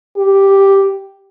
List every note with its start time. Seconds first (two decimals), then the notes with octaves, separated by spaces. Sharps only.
0.17 G4